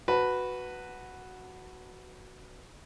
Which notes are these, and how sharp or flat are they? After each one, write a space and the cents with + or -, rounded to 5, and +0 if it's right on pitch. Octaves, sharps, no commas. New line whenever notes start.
F#4 +0 B4 +0 A5 +40